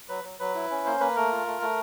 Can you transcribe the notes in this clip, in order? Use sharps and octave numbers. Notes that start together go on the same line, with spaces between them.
F#3 B4
F#3
F#3 B4
E4
C#4
A#3 C5
A#3 B4
A3 A#4
F4
A3
A3